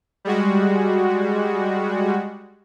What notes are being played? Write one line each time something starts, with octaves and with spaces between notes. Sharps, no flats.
G3 G#3 F#4